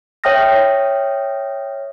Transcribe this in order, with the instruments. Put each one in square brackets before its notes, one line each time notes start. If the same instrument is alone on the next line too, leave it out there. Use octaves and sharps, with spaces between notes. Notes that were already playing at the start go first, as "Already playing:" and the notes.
[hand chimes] C#5 E5 G5 D#6 F6 A#6